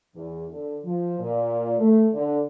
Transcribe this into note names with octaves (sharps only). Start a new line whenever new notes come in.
E2
D3
F3
A#2
A3
D3